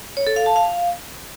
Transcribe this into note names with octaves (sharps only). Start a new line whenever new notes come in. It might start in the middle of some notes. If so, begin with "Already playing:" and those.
C#5
A4
F5
A5
F5